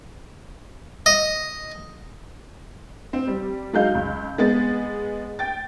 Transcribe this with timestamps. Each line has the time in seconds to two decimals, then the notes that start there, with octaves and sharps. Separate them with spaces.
1.06 D#5
3.13 C4
3.27 G3
3.73 F#3 G#3 D#4 F5 G6
3.95 C#2
4.38 G#3 B3 A6
5.39 G5 A6